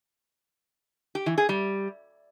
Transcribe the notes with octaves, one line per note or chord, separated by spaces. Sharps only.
G4
E3
G#4
G3